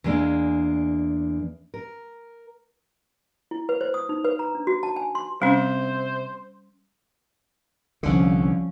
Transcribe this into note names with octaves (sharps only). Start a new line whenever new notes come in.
E2 E3 G#3 A#3 D4
A#4
E4
B4
C5
D#6
D#4
B4
A#5
D4
F#4
A5
G#5
C6
C3 G3 C#4 C5
C2 D3 F3 C#4